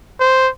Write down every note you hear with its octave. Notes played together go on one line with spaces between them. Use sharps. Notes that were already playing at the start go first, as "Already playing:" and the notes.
C5